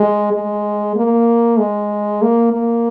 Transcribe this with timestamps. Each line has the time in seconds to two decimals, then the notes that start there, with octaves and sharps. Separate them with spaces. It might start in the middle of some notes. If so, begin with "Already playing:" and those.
Already playing: G#3
0.32 G#3
0.96 A#3
1.59 G#3
2.22 A#3
2.52 A#3